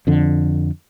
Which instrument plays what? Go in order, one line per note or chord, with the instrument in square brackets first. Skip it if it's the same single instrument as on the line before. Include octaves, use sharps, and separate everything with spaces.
[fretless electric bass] F2 D3